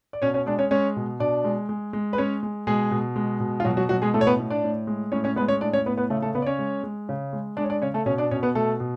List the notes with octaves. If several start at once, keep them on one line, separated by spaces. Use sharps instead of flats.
D5
B2 C#4 C#5
C#4 C#5
G#3 D4 D5
C#4 C#5
G#3 C#4 C#5
B2
B2 D4 D5
G#3
G#3
G#3
B4
G#3 C#4 C#5
G#3
B2 G#3 G#4
B2
G#3
B2
F4
B2 F#3 F#4
F#3 F#4
B2 F#3 F#4
G#3 G#4
A2 A3 A4
C#5
B3 B4
A2
D4 D5
A2
G#3
A2 C#4 C#5
C#4 C#5
G#3 B3 B4
C#4 C#5
A2 D4 D5
C#4 C#5
A2 B3 B4
B3 B4
C#3 A3 A4
A3 A4
C#3 B3 B4
D5
C#4 C#5
G#3
G#3
C#3
G#3
G#3 D4 D5
C#5
D4 D5
C#3 C#4 C#5
A3 A4
B2 C#4 C#5
D4 D5
B2 C#4 C#5
B3 B4
B2 A3 A4
B2